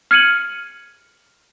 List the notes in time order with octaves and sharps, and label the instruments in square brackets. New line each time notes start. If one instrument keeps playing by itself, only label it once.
[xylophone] F6 G#6 C#7 D#7 F#7